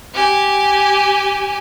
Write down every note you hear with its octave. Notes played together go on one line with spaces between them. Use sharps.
G4 G#5